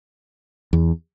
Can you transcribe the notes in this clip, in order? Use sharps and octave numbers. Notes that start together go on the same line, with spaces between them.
E2